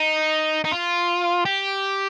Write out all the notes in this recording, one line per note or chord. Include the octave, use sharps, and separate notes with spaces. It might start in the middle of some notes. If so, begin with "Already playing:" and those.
Already playing: D#4
D#4
F4
G4